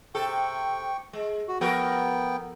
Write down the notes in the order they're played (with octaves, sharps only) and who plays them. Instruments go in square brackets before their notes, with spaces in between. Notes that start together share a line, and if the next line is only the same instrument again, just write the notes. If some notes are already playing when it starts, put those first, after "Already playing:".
[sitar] C3 A4 [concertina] G5 C#6
[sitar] G#3
[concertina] F#4
[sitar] F3 A4 A#4 [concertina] B3 G5